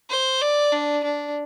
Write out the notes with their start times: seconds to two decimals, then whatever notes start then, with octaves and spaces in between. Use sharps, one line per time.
0.10 C5
0.42 D5
0.72 D4
1.04 D4